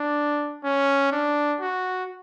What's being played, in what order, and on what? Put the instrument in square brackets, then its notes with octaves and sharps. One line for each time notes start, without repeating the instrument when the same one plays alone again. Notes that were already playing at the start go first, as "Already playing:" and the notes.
Already playing: [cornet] D4
C#4
D4
F#4